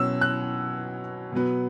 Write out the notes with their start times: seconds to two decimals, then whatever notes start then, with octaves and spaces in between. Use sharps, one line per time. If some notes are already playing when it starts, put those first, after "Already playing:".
Already playing: B2 F#3 C#4 E6
0.21 F#6
1.32 B2 F#3 B3